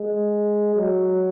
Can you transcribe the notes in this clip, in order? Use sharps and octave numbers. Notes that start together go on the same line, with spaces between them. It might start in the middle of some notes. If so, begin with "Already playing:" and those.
Already playing: G#3
F#3